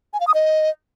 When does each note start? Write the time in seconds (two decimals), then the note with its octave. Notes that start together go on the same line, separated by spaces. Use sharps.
0.13 G#5
0.20 F5
0.27 D#6
0.34 D#5